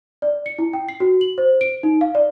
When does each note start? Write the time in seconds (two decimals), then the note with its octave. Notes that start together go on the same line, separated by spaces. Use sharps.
0.22 D5
0.46 C#7
0.59 E4
0.73 G5
0.89 C7
1.00 F#4
1.21 F#7
1.38 C5
1.61 D7
1.83 D#4
2.01 F5
2.15 D5